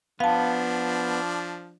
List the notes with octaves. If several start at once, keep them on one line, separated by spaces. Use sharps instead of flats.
F3 B3 D4 F5 A5